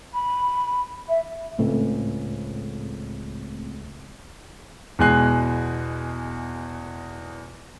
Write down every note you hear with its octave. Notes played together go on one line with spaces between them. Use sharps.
B5
E5
C#2 A2 A3 C4
E2 B2 G#3 G#5 F#6 C7